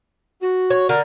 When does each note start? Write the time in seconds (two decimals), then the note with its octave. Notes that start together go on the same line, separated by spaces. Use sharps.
0.41 F#4
0.70 C#5
0.89 D3 A#4